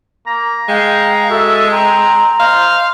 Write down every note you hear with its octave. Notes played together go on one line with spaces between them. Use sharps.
A#3 A#5
G#3 F5 G5
F#4 A4 E5
C4 G5 A#5
C5 D#5 F5